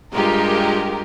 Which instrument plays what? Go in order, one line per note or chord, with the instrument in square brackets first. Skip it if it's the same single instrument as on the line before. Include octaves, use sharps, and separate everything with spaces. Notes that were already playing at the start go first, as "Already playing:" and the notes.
[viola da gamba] G2 G#3 [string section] F4 G4 A#4